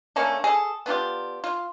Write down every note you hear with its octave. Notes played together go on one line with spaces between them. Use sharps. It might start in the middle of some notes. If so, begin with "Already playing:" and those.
D3 A3 A#3 C#4
G#4 A4
B3 D4 F4 G4
F4